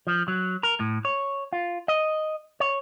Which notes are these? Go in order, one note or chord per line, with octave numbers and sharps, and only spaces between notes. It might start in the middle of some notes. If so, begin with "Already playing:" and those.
F3
F#3
A#4
A2
C#5
F4
D#5
C#5